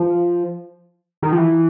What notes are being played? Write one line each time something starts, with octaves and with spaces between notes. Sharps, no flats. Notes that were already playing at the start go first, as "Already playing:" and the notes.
Already playing: F3
D#3
F3
E3